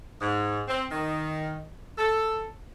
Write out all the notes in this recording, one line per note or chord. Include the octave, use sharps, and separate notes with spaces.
G#2
C4
D#3
A4